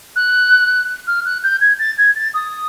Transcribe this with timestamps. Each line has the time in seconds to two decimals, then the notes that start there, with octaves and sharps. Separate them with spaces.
0.16 F#6
1.07 F6
1.25 F#6
1.44 G6
1.61 G#6
1.79 A6
1.98 G#6
2.16 A6
2.34 D#6